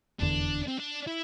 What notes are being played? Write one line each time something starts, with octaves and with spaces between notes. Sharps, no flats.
F1 E2 D3 D4
C4
D4
E4